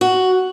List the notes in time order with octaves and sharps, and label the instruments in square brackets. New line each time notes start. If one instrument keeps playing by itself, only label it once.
[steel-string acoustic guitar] F#4